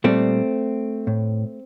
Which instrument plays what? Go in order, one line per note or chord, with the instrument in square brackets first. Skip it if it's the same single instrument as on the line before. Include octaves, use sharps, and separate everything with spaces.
[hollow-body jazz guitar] A#2 G3 A3 C4
A2